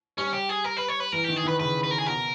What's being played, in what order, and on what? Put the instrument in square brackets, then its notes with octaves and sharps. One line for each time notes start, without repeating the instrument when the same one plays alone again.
[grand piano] G3 [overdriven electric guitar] C#4
[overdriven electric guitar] G4
G#4
A#4
B4
C#5
B4
[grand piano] E3 [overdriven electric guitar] A#4
[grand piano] D#3 [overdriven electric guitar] G4
[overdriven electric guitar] G#4
[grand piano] D#3 [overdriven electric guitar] B4
[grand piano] C#3 [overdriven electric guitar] B4
[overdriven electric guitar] B4
A#4
G#4
[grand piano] B2 [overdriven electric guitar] A#4